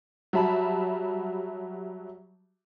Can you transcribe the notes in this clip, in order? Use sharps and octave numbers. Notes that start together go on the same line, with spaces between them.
F#3 G3 E5 A5 B5